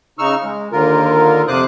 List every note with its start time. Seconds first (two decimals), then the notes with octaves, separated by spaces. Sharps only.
0.19 C#3 D#4 C#6 E6 F6
0.43 G#3
0.72 D#2 D3 F4 A#4
1.48 F2 C3 C5 D6 D#6 F#6